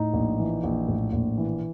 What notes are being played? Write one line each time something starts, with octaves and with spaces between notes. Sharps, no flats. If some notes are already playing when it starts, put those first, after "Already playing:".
Already playing: A2 D#4
A#1
E3
A#1
A2
A#1
E3